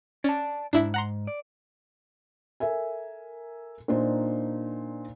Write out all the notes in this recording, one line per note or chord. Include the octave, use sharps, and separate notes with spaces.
C#4 D5 A5
G#2 D4 E4 E5
F#5 A#5 C6
D5
A4 A#4 E5 G#5
A#2 D4 D#4 C5